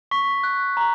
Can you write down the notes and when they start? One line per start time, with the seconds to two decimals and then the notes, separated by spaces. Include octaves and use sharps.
0.11 C#6 B6
0.44 F#6
0.77 A#5